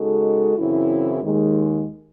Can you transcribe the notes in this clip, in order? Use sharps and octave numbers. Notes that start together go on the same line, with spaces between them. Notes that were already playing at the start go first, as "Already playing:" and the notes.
Already playing: C#3 G#3 D#4 F#4 A4
F#2 C#3 E3 C4 E4
D#2 D#3 G#3